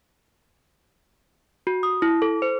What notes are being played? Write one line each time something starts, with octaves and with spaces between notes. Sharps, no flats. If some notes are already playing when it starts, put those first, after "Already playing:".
F#4
D#6
E4
A4
C5